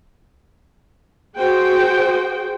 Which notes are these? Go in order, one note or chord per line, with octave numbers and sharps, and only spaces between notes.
F#4 G#4 C5 G5